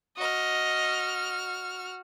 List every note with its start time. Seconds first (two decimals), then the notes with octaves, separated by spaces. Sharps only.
0.18 F#4 D#5 F6